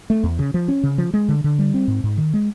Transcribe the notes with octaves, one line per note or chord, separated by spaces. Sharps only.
A3
E2
C#3
F3
C#4
C#3
F3
G#3
D3
D3
G3
C4
G#2
G#2
D#3
G#3